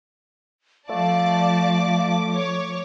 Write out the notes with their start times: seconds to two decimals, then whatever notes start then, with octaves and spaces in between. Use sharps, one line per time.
0.89 F3 A3 D5 F5 A5 D6
2.33 C#5